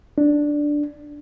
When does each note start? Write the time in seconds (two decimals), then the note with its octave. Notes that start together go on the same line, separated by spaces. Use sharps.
0.18 D4